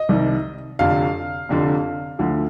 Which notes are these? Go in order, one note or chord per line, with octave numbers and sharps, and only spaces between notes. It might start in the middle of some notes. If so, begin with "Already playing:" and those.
Already playing: D#5
C2 C3 D#3 G3
F1 F2 D3 F5
F1 F2 D3
D2 D3 F3